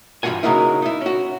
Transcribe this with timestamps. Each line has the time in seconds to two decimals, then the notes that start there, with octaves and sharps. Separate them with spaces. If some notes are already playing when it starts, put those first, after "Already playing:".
0.23 G2 E3 F#3 F4 F#5 G#5
0.43 C#3 F#3 G#3 A#3 D#4 E4
0.82 D#4 E4
1.01 C#4 F#4